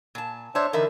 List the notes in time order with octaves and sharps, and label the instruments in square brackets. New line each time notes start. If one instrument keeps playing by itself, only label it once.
[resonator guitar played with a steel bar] A#2 A5
[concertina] D4 C5 E5 [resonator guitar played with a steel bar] C#5 A5
[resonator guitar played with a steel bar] D3 E3 E5 [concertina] D#4 [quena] A#4